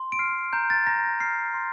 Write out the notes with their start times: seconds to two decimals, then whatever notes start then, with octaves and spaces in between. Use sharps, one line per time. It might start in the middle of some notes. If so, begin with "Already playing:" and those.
Already playing: C6
0.12 D7
0.19 F6 C7
0.53 A#5 G6
0.70 A6
0.87 A#5 A#6
1.20 F6 C7
1.54 C6